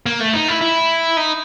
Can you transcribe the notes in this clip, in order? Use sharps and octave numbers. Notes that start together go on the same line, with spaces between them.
A#3
A3
D#4
E4
E4
D#4